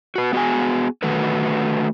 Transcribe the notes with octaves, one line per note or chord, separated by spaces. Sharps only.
F#4 B4
B3 F#4 G#4 G#5
D3 D#3 A3 F#4 A4 B4